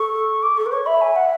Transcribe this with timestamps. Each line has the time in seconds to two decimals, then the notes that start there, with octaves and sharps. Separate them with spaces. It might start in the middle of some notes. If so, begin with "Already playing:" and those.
Already playing: A4 C#6
0.43 D6
0.57 A4 C#6
0.66 B4
0.72 C#5 C#6
0.86 E5 B5
1.01 G#5
1.16 F#5